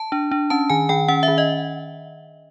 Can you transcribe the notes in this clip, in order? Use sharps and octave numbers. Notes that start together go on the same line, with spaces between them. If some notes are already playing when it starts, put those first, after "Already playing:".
Already playing: A5
D4
D4
C#4 A5
D#3 G#5
D#3 G5
C#4 F#5
E5
D#3
D#5